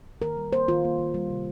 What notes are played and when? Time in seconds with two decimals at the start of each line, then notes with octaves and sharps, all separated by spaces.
0.22 D#3 A#4
0.37 G3
0.53 A#3 C5
0.68 D#3 F4
0.84 A#3
0.99 D#3
1.14 G3
1.30 C3